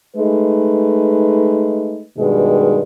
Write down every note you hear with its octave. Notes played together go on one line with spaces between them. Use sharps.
G#3 A3 D#4 B4
G2 B2 D#3 G#3